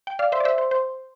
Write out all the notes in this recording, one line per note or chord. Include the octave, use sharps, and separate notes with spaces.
G5
D5 F5
C5 E5
D5
C5 E5
C5
C5